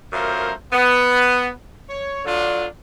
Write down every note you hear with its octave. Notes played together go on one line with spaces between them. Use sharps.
F#2 A3 F4 A#4 C5
B3
C#5
D3 F#3 D4 F4